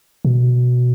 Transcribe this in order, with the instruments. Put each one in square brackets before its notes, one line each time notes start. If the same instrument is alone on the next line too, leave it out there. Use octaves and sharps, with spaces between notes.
[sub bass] B2